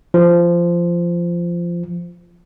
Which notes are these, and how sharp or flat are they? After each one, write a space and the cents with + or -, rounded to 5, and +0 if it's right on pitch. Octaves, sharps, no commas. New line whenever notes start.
F3 -15